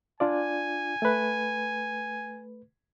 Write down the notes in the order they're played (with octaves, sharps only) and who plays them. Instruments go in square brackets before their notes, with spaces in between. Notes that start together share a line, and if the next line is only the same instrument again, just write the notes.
[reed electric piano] D4 F4 D5 [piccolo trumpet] G#5
[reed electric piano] A3 B4